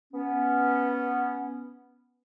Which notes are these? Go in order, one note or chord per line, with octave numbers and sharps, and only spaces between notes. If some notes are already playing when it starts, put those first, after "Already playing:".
B3 C#4